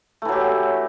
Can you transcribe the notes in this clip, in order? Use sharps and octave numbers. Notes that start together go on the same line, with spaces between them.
E3 F#3 A3 G4